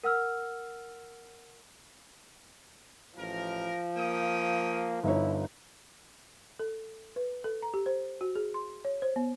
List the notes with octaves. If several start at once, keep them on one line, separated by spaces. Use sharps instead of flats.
A#4 F#5 E6 F6
A1 F3 A#4
A#3 C#4 G5 D#6
G1 D#4 E4 C#5
A4
B4
A4
A#5
G4
C5
F#4
G#4
C6
C#5
C5
B3